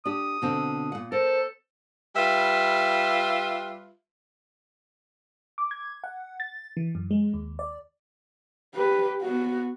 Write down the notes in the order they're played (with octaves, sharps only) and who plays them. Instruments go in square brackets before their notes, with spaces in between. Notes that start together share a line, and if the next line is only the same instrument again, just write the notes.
[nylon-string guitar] D4 G4 [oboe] D#6
[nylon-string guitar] B2 D3 C4
A#2 F#5
[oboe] A4 [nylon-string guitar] A#4 [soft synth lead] C5
[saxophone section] G3 F4 B4 E5
[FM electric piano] D6
G#6
F#5
A6
E3
F#2
G#3
D#2
D5
[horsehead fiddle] G4 B4
B3 F#4